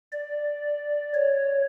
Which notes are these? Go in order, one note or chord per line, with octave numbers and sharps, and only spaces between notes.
D5
C#5